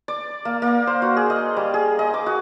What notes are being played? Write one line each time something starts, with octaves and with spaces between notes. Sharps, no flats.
D5
A#3
A#3
C5
F#4
G#4
D#5
G3
G#4
D#5
D6
F#4